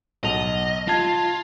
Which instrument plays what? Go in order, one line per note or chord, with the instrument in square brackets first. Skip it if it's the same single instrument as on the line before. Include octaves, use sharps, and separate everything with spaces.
[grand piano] B1 F7 [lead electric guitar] D#5
[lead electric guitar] F4 [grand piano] A5 G#6